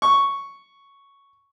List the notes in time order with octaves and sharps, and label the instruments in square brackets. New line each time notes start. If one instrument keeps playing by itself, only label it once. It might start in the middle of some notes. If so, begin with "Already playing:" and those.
[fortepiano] C#6